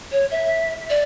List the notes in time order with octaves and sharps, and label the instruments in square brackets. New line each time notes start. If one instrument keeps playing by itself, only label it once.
[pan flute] C#5
E5
D5